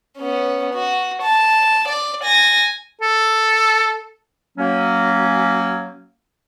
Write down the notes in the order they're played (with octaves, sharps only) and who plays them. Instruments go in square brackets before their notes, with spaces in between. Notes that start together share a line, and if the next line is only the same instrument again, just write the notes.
[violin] B3 C#4
F#4
A5
D5
G#5 A#6
[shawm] A4
[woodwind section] F#3 A#3 C#4